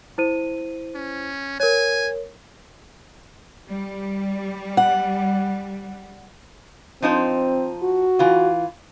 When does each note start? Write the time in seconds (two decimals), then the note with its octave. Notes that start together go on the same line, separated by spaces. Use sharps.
0.18 E4 C5 D#7
0.95 C#4
1.60 A#4 C#5 G#5
3.68 G3
4.77 F#5
7.02 F3 C4 D#4 C5
7.83 F#4
8.19 E3 F4